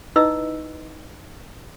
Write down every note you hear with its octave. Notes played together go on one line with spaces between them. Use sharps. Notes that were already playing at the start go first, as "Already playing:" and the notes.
D#4 E4 B4 D#5 E6